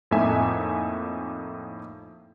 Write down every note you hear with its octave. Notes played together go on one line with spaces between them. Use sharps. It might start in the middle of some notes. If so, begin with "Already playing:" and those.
F2 A2 A#3 D#4 E5 G#5